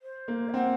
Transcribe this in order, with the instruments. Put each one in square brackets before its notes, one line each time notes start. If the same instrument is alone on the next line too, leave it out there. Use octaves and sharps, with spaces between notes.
[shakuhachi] C5
[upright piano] A#3
[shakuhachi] F5
[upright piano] C4 [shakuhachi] F#5